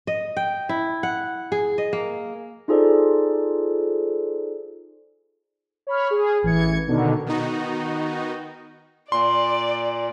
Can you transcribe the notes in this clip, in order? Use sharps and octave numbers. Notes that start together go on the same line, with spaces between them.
D#5
G5
E4
F#5
G#4
D#5
A#3
D#4 F4 G#4 A4 C5 D5
C#5 B5 F6
G#4
A1 E3 G#6 C#7
B2 D3 D#3
D#3 B3 D#4 F#4
A#2 D5 C6